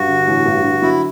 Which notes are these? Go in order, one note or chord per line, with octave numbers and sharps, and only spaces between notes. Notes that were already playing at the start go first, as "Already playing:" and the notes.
Already playing: G2 F#4
D3
A1
G2
D3
F#3 E4